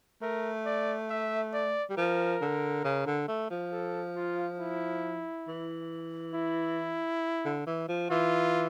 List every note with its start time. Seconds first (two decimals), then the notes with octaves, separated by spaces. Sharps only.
0.22 A3 A#4
0.65 D5
1.10 E5
1.53 D5
1.90 G3
1.97 F3 A#4
2.41 D3
2.84 C#3
3.06 D3
3.28 A3
3.51 F3
3.72 A4
4.16 F4
4.60 E4
5.48 E3
6.34 E4
7.45 D3
7.67 E3
7.88 F3
8.10 E3 F4